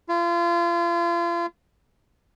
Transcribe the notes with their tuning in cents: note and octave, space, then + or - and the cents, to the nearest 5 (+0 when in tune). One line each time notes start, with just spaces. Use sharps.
F4 -35